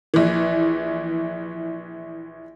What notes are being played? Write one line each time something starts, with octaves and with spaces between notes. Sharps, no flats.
A#1 E3